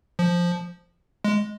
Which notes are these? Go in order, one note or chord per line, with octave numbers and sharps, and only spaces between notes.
F3
G#3